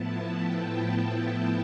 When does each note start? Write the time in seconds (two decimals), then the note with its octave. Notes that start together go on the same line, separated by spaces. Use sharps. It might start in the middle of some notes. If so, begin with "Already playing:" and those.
Already playing: A2 F3 B3 E4 A5
0.33 G5